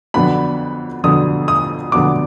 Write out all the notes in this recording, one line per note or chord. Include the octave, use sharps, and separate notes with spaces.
F2 D3 F#3 B3 D4 B5
F2 D3 F#3 B3 D4 D#6
D#6
F2 D3 F#3 B3 D4 D6